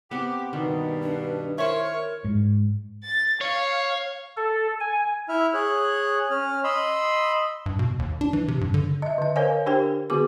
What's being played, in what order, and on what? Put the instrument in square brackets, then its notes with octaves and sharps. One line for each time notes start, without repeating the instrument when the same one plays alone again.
[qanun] B3 C4 [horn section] G4
[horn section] G2 B2 [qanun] D#3
[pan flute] D4
[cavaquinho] E4 C5 [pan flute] A#4 [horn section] C#5
[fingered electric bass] G#2
[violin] A6
[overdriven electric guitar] C#5 [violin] F5
[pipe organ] A4
G#5
[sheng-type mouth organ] E4 E5 F6
G#4 C#5 F#6
C#4 F6
D#5 B5 C6 E6
[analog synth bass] G2
B2
D#2
D4
E3
C3
G2
D3
[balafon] D#5 E5
D3 D#5
A#4 C5 C#5 F5 G#5
D4 G4 A#4 C5 G5
D3 B3 F#4 G#4 D6